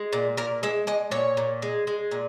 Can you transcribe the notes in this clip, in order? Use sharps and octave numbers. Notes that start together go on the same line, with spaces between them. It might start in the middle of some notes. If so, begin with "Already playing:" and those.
Already playing: G#3
A#2
A#2 A#4
G#3 E5
G#3 D#5
A#2 C#5
A#2
G#3
G#3
A#2